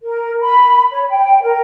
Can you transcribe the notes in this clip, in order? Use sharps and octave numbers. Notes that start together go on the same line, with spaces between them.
A#4
B5
C#5
G5
A#4